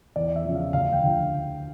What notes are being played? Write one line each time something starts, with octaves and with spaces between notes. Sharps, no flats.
E2 D5
E5
C#3 F3
F5
D2 F5
G5
D3 F3